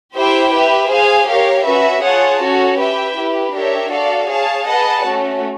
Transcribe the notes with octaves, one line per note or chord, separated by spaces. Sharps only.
E4 G4 C5 E5 G5
G4 B4 E5
G#4 C5 F5 G#5
G4 A#4 C#5 F5
C#4 F#4 B4 E5
F4 G#4 C#5 F#5 A5
C#4 F#4 A4 C#5
G4 B4 E5 G5
E4 G4 B4
D4 G4 A#4 C#5 E5
F#4 A4 D5 F5
G#4 C#5 F5 A5
G#4 B4 D#5 F#5 A5
A3 C#4 F#4